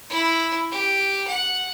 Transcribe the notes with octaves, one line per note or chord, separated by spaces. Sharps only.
E4
G4
F#5